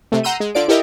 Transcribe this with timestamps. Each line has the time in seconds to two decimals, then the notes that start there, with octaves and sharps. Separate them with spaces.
0.12 C3 A3
0.24 F#5 A#5 C6 E6 G6 D#7
0.40 G#3
0.55 D3 F4 D5 D7
0.68 E4 G4 A4 A#4 D#5 E5